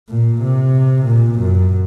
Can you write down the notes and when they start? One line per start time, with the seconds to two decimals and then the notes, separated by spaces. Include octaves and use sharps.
0.09 A#2
0.42 C3
1.06 A#2
1.39 F#2